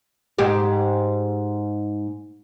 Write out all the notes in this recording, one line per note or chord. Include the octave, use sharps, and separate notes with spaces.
G#2 G4